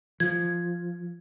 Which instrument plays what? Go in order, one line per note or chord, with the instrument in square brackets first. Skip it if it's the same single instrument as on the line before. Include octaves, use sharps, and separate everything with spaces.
[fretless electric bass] F3 [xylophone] G#6